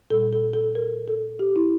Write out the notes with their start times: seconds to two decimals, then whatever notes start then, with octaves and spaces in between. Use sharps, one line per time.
0.10 A#2 G3 A4
0.33 A4
0.54 A4
0.75 A#4
1.08 A4
1.39 G4
1.56 E4